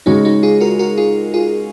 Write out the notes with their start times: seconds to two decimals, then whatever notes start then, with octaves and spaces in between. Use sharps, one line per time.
0.06 C#3 G#3 C#4 D#4 F#4
0.25 D#4 F#4
0.43 F4 G#4
0.60 F#4 A#4
0.79 F#4 A#4
0.97 F4 G#4
1.34 F4 G#4